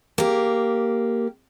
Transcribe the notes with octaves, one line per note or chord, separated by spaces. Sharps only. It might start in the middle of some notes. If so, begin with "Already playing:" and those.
A#3 G4